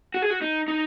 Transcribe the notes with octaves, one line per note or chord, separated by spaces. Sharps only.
F#4
G#4
F#4
D#4
D#4